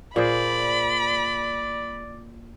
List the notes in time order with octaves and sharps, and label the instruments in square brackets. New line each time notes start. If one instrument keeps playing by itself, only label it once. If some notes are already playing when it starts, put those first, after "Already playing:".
[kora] A#2 G#4 C5 [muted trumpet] D5 [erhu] B5